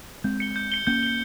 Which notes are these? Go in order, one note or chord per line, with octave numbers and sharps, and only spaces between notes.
G#3 C4 G6
C#7 G7
G6
C#7 G7
A#3 C#4 G6
C#7 G7